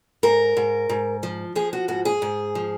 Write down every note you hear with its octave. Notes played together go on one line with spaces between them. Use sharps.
G#2 A#4
G#2
G#2
F3
F3 G#4
F#4
G#2 F#4
G#4
G#2
F3